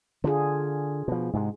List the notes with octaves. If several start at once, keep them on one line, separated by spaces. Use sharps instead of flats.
D3 D4 F4 G#4
B2 F3
G#2 C3 G#3